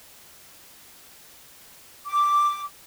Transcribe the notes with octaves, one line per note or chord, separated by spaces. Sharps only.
D6